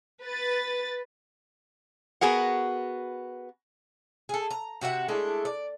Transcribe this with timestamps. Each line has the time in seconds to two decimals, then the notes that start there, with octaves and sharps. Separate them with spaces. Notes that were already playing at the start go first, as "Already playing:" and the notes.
0.24 B4 A6
2.21 B3 F#4 G#4 A#4 F#5
4.29 G#4 A4
4.51 A#5
4.81 C3 F#4 E5 F#5
5.08 G#3 A3 D4 E4
5.45 D5